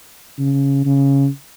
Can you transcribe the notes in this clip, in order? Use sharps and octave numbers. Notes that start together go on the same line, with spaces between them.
C#3
C#3